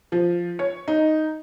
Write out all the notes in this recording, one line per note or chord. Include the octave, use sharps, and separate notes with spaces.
F3
C#5
D#4